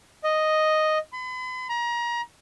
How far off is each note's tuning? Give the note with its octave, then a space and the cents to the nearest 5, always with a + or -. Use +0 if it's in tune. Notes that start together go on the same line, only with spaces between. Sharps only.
D#5 +0
B5 +45
A#5 +30